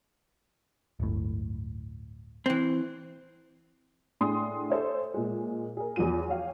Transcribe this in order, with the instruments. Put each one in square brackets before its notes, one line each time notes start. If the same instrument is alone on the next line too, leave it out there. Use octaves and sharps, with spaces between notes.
[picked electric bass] D1 G1 A2
[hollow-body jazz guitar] E3 C4
[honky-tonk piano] A2 D4 G#4 C6 D#6
A4 C5 C#5 E5
A#2 G#3
G#4 A#4
E2 F3 F#3 F4 D#7
F#4 C#5 F5 G5